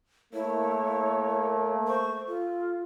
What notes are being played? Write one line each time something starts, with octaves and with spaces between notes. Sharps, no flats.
A3 A#3 E4 C#5
C5 C#6
F4 A4